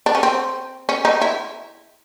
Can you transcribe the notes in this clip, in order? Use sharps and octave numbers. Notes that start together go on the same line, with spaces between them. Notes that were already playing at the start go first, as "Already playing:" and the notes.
D4
C#4
C4
C#4
D#4
E4